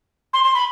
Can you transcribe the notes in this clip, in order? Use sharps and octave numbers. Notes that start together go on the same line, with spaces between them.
C6
C6
B5